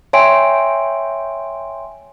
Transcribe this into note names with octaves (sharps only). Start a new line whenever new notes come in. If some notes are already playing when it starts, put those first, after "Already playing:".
C#5 E5 G5 G#5 C6 D7